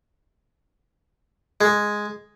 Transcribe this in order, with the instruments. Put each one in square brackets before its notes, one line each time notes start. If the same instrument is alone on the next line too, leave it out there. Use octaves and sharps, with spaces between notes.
[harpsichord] G#3